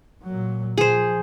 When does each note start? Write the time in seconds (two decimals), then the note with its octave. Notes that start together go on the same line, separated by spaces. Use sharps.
0.23 A#2 F#3
0.78 A#2 F3 G#4 C5